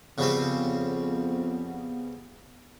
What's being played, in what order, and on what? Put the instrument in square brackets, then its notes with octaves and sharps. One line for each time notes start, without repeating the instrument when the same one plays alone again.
[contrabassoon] F2 [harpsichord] C#3 G3 C4 [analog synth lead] B3